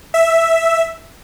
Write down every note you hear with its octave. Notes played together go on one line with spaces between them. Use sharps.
E5